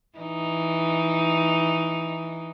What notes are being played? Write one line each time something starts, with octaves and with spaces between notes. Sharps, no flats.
E3 D#4